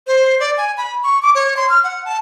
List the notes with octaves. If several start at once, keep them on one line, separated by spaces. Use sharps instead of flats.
C5
D5
G#5
B5
C#6
D6
C#5
C6
F6
F#5
A5